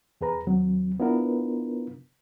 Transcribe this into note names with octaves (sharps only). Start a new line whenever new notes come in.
E2 G#4 B4 A#5
D#2 F#3 C4
B3 D4 E4 F4 A#4 B4